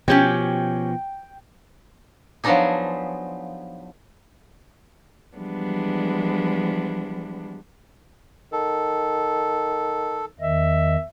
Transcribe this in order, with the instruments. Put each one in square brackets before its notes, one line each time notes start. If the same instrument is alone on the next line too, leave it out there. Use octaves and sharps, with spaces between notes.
[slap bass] B2 F3 [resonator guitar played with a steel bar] C#4 G4 C#5 [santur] G5
[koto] F3 F#3 B3 D4 D#4 G#4
[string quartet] E3 F3 G3 G#3 B3 D4
[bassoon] D#3 [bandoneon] A4
[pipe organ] E2 D#3 D#5 [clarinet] E5